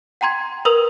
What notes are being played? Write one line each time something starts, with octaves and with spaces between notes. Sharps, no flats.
F#5 G5 A#5 C6 G#6
A#4 B4 A#5 D#6 E6 F7